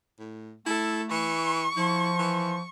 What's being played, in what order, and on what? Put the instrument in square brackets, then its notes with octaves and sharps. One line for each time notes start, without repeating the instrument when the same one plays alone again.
[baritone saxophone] A2
[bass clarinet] A3 [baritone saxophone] E4 [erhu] A4
[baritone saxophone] E3 [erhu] C#6
[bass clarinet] F3 [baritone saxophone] E4
[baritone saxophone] E3